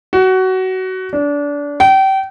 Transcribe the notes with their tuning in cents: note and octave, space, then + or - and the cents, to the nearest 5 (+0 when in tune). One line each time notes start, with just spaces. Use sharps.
F#4 +20
D4 -25
G5 -30